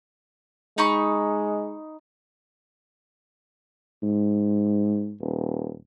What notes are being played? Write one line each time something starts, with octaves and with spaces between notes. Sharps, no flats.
G#3 D#4 B5 C#6
G#2
D#1